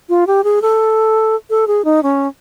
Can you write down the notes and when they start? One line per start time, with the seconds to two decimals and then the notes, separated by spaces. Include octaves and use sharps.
0.09 F4
0.27 G4
0.44 G#4
0.62 A4
1.50 A4
1.67 G#4
1.85 D#4
2.03 C#4